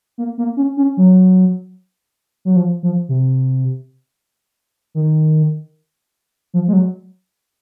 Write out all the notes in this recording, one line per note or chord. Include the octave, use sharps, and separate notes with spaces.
A#3
A#3
C#4
C#4
F#3
F#3
F3
F3
C3
D#3
F3
G#3
F#3